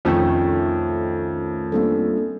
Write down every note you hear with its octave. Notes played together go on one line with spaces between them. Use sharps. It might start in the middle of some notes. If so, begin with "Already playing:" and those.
C2 F2 D#3 A3 C#4 D#4 G5
G3 A#3 C4 D4 F4 A4